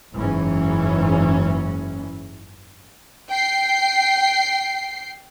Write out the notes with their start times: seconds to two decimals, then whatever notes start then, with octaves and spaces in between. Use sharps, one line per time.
0.12 F#1 G#2 E3 C#4
3.30 G5 C7